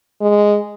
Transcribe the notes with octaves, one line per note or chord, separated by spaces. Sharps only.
G#3